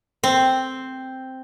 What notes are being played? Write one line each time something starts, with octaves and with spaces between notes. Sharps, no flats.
C4